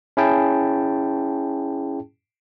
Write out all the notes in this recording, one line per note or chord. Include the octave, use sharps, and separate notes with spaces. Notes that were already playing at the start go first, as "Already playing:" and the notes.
C#4 E4 G#4 G5 A5